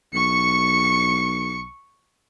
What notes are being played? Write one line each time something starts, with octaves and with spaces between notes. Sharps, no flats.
B1 C#6 C#7